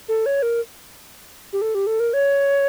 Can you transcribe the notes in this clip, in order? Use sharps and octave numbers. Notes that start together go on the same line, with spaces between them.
A4
C#5
A#4
G4
A4
G4
A4
A#4
C#5